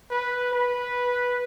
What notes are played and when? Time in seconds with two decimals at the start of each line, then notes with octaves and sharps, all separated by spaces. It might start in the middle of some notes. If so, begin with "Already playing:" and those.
0.11 B4
0.53 B4